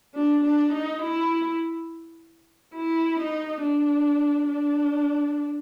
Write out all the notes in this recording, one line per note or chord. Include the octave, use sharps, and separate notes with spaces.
D4
D4
D#4
E4
E4
D#4
D4
D4